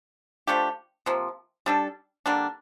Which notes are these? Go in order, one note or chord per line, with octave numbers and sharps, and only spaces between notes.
F3 A3 D4 G4
C3 F3 A#3
G3 D4 A4
D3 G3 A#3 D4